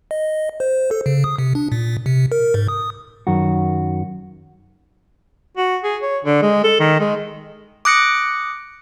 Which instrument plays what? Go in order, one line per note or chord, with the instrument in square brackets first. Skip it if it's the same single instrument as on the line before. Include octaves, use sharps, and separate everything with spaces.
[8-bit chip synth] D#5
C5
A4
C#3
D#6
C3
D4
A#2
C3
A#4
G#2
D#6
[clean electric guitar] F#2 D#3 F#4
[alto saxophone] F#4
G#4
C#5
D3
G#3
A4
D#3
G#3
[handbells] D6 D#6 F#6 A#6 C#7 D7